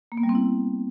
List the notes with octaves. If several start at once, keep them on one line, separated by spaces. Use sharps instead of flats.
A#3
B3
G3
C4
E4